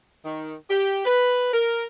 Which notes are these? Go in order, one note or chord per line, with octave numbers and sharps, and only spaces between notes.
D#3
G4
B4
A#4